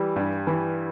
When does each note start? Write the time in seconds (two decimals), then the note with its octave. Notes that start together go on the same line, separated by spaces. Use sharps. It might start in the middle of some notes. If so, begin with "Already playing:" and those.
Already playing: E3 G3
0.16 G2
0.47 E3